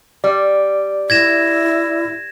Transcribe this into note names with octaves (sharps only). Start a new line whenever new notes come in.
G3 D5
E4 G#6 A#6 E7